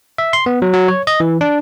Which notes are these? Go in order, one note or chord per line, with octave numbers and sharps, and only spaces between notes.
E5
C6
B3
F#3
F#3
C#5
D#5
E3
D4